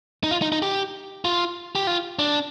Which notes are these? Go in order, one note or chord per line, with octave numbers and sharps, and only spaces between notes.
D#4
F4
D#4
D#4
G4
F4
G4
F4
D4